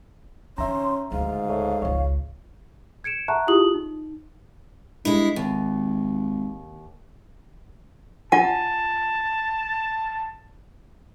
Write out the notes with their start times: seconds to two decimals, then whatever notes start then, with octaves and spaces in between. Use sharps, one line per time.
0.58 D#3 C#4 E5 A#5 C6
1.12 D2 G#2 C#3 F5
1.49 A4 C#5 E5
1.82 G#1 C#2 C#5
3.04 G#6 C#7 D7 E7
3.28 E5 F#5 A5 A#5 C#6 F#6
3.47 E4 F4 G4 G#4 D#6 F#7
3.74 D#4
5.05 G2 G#3 E4
5.36 G#1 D#2
8.32 F4 F#5 G#5 A5